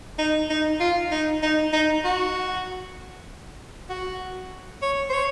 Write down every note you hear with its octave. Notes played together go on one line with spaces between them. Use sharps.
D#4
D#4
F4
D#4
D#4
D#4
F#4
F#4
C#5
C5
C#5